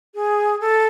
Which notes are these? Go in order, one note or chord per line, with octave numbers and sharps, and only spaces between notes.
G#4
A4